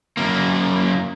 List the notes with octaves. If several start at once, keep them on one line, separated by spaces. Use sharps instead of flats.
F#2 A#3